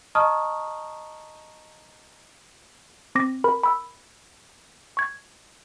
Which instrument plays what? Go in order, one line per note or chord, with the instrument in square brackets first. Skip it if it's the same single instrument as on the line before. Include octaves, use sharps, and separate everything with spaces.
[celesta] D#5 A5 A#5 C#6 D#6 F6
[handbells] C4 D6 A#6
A#4 B5
B5 E6
C#6 G#6